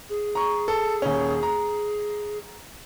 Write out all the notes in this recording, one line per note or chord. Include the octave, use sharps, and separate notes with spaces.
G#4
A#5 C#6
A4
D#1 C#4
A#5